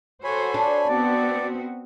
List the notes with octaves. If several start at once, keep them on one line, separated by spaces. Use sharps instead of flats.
F#4 A4 C5 C#5 G#5 B5
D4
B3 C4 F#4 D5